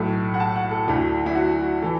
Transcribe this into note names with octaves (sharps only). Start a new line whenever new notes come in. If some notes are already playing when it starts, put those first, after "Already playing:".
Already playing: B1 A2 A3 A5
F#5
A5
F#5
A4
D2 D3 A3 E4
E4
F#4
E3 A4